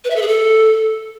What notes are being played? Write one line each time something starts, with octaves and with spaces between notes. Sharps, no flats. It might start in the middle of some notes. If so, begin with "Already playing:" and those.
B4
E5
A4
G#4
A4